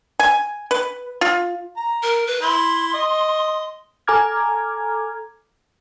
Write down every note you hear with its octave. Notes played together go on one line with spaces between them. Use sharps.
G#5
B4
F4
A#5
A#4
B4
E4 C6
D#5
A4 G#5 A#5 D6 F6 G#6